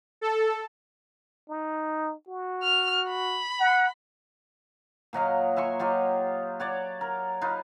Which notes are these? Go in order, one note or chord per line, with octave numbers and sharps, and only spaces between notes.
A4
D#4
F#4
F6
B5
F#5
A#2 F#3 D#5 F5
E5 G#5 C6 C#6
F#3 F4 G4 D#5
F#4 C#5 D5
A#4
D#4 F4 B4